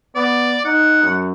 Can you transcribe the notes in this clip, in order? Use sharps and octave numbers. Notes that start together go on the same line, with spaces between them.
B3 D5
D#4 F#5
F#2